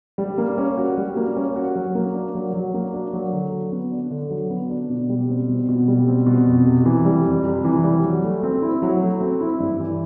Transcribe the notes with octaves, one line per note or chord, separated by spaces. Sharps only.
G3
A#3
C#4
F#4
G3
A#3
C#4
F#4
F#3
A#3
D4
F#3
F#3
A#3
D4
F#3
D3
F#3
B3
D4
D3
F#3
B3
D4
B2
G3
C4
B2
B2
G3
C4
B2
F2
C3
E3
G3
F2
C3
E3
G3
F#3
A3
C4
E4
F#3
A3
C4
E4
G2
E3